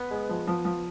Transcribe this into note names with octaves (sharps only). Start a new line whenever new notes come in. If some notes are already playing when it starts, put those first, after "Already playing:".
Already playing: B3
G#3
F3
F3
F3